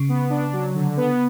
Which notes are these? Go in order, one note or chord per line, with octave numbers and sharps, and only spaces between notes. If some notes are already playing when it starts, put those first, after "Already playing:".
Already playing: C#3
B3
D4
F#3
D3
B3